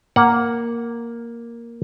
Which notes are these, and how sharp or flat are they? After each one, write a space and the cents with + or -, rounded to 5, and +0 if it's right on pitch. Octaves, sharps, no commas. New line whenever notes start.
A#3 +0 F#5 +0